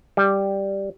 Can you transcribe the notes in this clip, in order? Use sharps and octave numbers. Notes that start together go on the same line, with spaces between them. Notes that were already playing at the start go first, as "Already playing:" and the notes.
G3